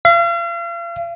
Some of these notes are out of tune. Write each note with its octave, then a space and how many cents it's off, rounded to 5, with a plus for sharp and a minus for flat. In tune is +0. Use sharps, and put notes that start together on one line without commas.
F5 -40